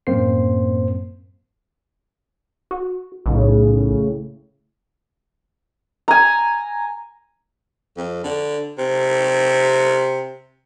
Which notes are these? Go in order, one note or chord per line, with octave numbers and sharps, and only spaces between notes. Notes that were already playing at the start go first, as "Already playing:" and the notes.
F#2 A2 A#3 C4 C5 C7
F#4
B1 A2 C#3
G#5 A#5
F2
D3
C3